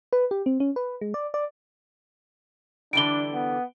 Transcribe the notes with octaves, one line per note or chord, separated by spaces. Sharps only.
B4
G4
C4
C#4
B4
G#3
D5
D5
D3 E3 G3 D4 D7 G7
B3